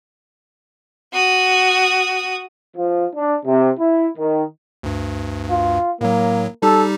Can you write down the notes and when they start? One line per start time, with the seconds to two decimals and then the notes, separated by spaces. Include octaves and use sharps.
1.13 F#4 D#6
2.77 F3
3.13 D4
3.45 C3
3.79 E4
4.18 D#3
4.83 D2 G2
5.50 F4
6.01 A2 F#3 A#3
6.62 G3 D#4 G4 A4